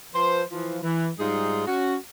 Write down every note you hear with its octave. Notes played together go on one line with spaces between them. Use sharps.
F3 B4 C5
E3 F3
E3
G#2 G3 D#4 F4 G#4
C#4 F#4